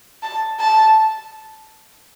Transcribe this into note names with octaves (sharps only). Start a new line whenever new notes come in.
A5
A5